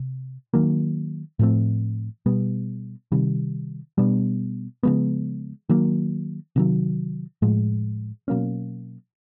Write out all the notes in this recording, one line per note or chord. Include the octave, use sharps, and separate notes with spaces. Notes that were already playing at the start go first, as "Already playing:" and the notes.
Already playing: C3
D#3 F#3 A#3
A2 F3 A3 C4
B2 G3 B3
C3 D#3 G3
B2 G3 B3 D4
C#3 F3 G#3 B3
D#3 F#3 A#3
C3 D#3 F#3
A2 F3 G#3
B2 F#3 A#3 C#4